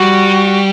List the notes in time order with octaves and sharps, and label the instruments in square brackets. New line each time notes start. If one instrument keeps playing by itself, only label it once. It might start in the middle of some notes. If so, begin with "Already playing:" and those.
Already playing: [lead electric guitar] G3 [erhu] F#4